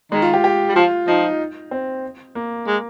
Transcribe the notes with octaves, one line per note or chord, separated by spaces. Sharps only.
D#3 G#3
F4
G4
G4
G3
F3 F4
F3 D#4
C4
A#3
G#3